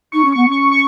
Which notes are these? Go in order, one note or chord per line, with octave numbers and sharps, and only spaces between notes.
D#4 C#6
C#4
B3 C#6
C#4 C#6
C#6